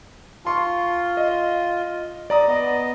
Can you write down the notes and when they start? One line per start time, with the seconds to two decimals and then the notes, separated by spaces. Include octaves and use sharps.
0.45 F4 A5 C6 C#6
1.17 D#5
2.30 D5 A#5 D#6
2.48 B3 D#5